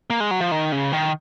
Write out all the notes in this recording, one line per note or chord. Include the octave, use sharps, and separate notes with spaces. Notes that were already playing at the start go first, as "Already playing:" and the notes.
A#3
G#3
F#3
F3
D#3
C#3
D#3